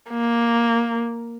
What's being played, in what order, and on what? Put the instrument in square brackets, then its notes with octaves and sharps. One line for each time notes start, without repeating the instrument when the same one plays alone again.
[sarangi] A#3